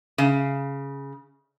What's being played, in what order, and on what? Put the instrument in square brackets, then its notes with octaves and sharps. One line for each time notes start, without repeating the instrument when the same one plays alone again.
[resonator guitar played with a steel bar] C#3